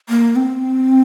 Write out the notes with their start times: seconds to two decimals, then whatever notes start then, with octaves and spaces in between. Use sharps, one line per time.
0.09 A#3
0.36 C4